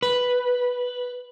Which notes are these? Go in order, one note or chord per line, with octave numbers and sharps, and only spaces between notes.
B4